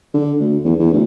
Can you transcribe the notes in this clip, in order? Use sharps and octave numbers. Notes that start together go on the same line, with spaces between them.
D3
D2
E2
E2
D2